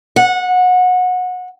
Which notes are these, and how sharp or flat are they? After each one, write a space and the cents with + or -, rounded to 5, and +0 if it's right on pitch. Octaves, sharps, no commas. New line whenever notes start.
F#5 -25